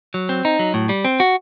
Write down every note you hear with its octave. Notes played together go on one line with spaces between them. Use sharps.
F#3
C4
D#4
F#3
A2
G3
C4
F#4